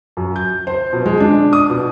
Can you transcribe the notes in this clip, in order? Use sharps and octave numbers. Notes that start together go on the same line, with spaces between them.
F#2
G6
C5
B2
G#3
D4
D#6
B2